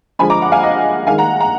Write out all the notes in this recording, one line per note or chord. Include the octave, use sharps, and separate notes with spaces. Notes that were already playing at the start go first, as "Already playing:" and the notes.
D3 F3 G#3 G#5 B5
A#5 D6
F#5
F5 G#5
D#5 F#5
D#3 G#3 F5 G#5
F#5 A#5
F#5 A#5